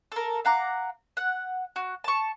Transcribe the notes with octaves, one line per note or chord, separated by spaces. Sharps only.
A4 A#4
F5 F#5 A#5 D6
F#5
F#4
A5 C#6